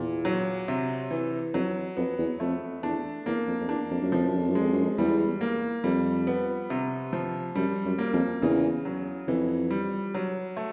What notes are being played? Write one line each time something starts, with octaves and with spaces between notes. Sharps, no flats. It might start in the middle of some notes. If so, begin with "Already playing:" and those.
Already playing: E2 A#2
F#3
C3
E3
F2 F#3
F2 B3
E2
F2 A3
E2 D4
E2 A#3
F2
F2
E2 D4
F2
F#2
F2 F3
F#2
F2
F#2
G#3
F2
F#2
F2
E2 G3
A#3
F2 G3
B3
C3
F3
F#2 G3
F#2
A#3
F2
E2 C#3
F#3
F2 E3
G3
F#3
A3